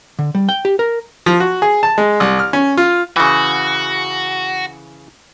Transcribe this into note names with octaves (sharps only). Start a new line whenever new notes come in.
D3
G3
G5
G4
A#4
F3
F#4
G#4
A5
G#3
C2
F6
C#4
F4
C#3 E3 F#4